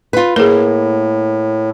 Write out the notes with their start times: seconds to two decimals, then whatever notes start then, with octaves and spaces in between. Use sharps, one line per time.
0.13 F4 B4
0.36 A2 A#3 G#4 A#4